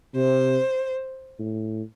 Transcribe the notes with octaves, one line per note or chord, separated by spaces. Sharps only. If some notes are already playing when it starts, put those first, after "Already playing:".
C3 C5
A2